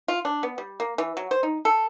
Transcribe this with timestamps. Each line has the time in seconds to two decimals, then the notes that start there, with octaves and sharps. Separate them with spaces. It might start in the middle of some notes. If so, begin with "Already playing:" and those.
0.08 F4
0.25 D4
0.43 B3
0.58 G3
0.80 A#3
0.98 E3
1.17 F#3
1.31 C5
1.43 D#4
1.65 A4